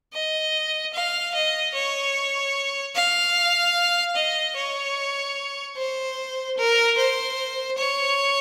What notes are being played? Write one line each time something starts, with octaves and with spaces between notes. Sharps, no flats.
D#5
F5
D#5
C#5
F5
D#5
C#5
C5
A#4
C5
C#5